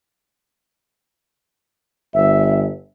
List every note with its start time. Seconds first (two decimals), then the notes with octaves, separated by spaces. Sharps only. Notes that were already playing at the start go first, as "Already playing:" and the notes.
2.14 G1 E5